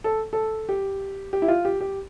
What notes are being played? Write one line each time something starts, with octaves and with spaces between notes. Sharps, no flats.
A4
A4
G4
G4
E4
F4
G4
G4